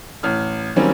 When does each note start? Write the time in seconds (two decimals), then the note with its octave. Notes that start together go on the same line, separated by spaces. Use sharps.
0.23 A1 F6
0.76 D#3 F#3 G3 A#3 C4 C#4